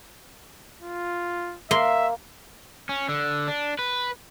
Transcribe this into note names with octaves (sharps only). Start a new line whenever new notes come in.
F4
A#3 E5 C6
C#4
D3
D4
B4